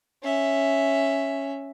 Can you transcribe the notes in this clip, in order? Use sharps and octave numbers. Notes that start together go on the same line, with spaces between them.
C#4 E5